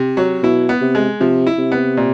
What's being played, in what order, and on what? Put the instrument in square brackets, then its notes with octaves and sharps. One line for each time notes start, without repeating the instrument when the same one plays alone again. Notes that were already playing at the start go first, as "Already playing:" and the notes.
Already playing: [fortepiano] C3
F#3
[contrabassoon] B2 [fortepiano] E4
[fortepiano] B3
[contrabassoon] C3
[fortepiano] G#3
[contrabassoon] C3 [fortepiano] F3
[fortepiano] E4
[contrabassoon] C3
[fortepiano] B3
A#2